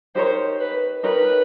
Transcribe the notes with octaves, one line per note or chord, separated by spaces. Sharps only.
D#4 G4 A#4 C5 C#5
B4
D#4 G4 A#4 B4 C#5